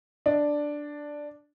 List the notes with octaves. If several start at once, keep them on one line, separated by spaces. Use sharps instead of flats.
D4